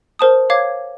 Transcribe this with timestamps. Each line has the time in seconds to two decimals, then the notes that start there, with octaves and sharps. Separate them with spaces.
0.19 A#4 C5 A5 D#6
0.50 C#5 F5 D6 G#6